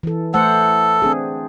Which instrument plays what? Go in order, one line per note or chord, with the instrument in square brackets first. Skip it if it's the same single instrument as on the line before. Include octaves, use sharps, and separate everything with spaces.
[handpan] E3 A4
[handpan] A3 C5 F#5 [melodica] A4
[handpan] C4 D4 G#4